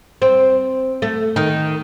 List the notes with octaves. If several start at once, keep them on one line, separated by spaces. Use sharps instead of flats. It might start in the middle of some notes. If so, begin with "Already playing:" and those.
C4
A3
D#3